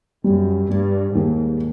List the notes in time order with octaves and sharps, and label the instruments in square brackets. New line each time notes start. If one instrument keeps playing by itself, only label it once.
[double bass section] F#2 [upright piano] G3
[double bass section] G2 [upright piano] G3
[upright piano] D#2 [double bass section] G#2